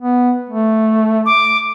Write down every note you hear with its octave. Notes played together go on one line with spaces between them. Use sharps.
B3
A3
D6